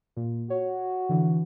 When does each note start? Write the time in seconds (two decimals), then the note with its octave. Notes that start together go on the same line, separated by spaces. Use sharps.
0.16 A#2
0.50 F#4 C#5
1.09 D3 E3